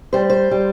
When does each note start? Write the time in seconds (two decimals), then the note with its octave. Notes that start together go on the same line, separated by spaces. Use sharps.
0.13 G3 C5
0.30 C5
0.51 G3